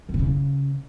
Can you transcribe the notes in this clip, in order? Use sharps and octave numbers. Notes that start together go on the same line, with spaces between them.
F#2
B2
C#3